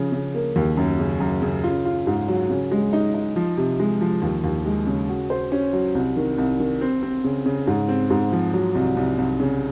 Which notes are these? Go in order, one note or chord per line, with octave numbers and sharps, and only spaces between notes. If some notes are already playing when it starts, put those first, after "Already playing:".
Already playing: C#3 F3
C#3
A#3
D#2
F#2
C#3
F#2
C#3
F4
F4
G#2
F#3
C#3
G#3
D#4
D#4
F3
C3
G#3
F3
D#2
D#2
G#3
C#3
F#4
C5
C#4
F#3
C2
D#3
C2
D#3
C4
C4
C#3
C#3
G#2
C4
G#2
F3
F#3
C2
C2
C2
C#3